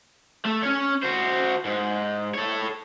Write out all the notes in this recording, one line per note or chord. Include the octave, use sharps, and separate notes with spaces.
A3
C#4 C#5
F#4 C5
G#2
A4 C#5